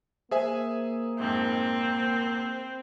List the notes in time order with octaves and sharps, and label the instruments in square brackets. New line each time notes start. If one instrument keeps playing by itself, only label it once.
[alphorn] A#3 [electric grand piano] G#4 E5 G#5 [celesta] C5
[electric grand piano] F2 G#2 [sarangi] C4